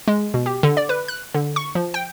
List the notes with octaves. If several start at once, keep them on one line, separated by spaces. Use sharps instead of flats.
G#3
B2
G4
D3
D5
B4
F#6
D3
C#6
F3
G5